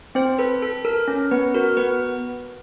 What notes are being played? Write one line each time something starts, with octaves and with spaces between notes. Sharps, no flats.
C4 C5
A4 B4
A4
A4 A#4
C#4
B3 B4
F#4 A#4
B3 B4